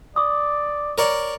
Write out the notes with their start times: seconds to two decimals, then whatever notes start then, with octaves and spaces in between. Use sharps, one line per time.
0.16 D5 D6 D#6
0.98 A#4 C#5 D5